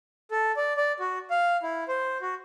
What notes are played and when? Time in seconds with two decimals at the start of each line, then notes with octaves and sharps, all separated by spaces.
0.31 A4
0.57 D5
0.77 D5
1.00 F#4
1.31 F5
1.63 E4
1.88 C5
2.22 F#4